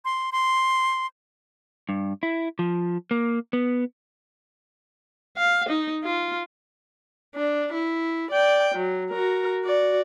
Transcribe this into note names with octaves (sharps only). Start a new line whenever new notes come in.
C6
C6
G2
E4
F3
A#3
B3
F5
D#4
F4
D4
E4
D5 G5
F#3
F#4 A#4
F#4 D5